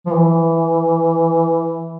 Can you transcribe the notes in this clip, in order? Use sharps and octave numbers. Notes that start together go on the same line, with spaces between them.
F3
E3